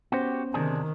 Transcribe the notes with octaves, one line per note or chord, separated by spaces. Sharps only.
B3 C#4 F#4 G4 C5
C3 D#3 D4 G#4